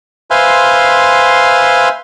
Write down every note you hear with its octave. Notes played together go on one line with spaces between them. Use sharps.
B4 C5 E5 F5 G#5 C6